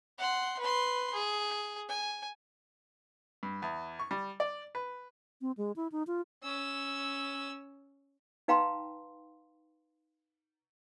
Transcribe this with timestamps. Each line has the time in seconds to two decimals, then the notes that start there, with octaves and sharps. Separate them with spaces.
0.18 F#5 C6
0.59 B4 C6
1.14 G#4
1.88 G#5
3.43 G2
3.62 E2
3.99 C#6
4.11 G3
4.40 D5
4.75 B4
5.41 C4
5.57 G#3
5.76 E4
5.92 D#4
6.07 F4
6.43 C#4 E6
8.48 D#4 B4 F5 G5 A#5 C6